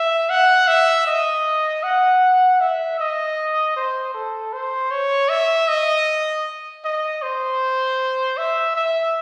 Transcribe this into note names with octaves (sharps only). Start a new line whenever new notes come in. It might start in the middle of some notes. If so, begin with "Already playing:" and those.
Already playing: E5
F#5
E5
D#5
F#5
E5
D#5
C5
A4
C5
C#5
E5
D#5
D#5
C5
E5
E5